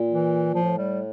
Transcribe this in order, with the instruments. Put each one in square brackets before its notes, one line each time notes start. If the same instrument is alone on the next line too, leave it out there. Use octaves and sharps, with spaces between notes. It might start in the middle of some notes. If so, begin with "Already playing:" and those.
Already playing: [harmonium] A#2
[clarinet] E3
[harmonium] A2 [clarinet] F3
[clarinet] G3